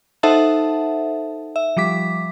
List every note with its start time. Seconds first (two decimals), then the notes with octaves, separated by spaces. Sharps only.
0.23 D#4 A4 C5 E5 F#5 A5
1.56 E5
1.77 F3 G3 D6 B6